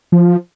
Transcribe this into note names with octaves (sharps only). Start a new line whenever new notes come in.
F3